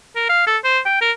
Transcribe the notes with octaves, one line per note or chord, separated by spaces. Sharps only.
A#4
F5
A4
C5
G5
A#4